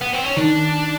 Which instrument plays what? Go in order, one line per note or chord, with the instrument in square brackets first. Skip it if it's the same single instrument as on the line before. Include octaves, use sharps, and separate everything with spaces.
[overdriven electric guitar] B3
C4
C#4
[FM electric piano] D#3 [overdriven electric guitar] D4